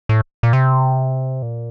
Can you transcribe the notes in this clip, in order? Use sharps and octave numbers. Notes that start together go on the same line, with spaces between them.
A2
A#2
C3
A#2